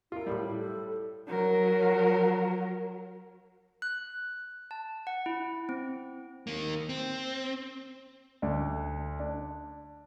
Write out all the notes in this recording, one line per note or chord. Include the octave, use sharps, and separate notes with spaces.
E4 F4 A#4
A2 G3
A4
F#3 A#4
F#6
A5
F#5
E4
C4
D#3 A#3
C4
D2 D4
D4